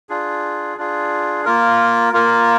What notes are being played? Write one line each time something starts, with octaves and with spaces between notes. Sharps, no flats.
D4 F4 G#4
D4 F4 G#4
A#3 F4 A#4
A#3 F4 A#4